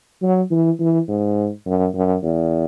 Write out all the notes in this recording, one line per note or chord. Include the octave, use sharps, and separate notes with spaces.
F#3
E3
E3
G#2
F#2
F#2
E2